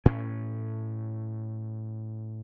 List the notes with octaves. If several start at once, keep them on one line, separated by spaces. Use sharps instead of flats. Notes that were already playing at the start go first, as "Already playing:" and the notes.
A2 C#4